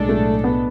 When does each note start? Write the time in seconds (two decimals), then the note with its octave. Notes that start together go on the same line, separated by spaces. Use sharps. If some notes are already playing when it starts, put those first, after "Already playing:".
Already playing: B1 A2 G#3 D4 A4
0.09 A3
0.44 B3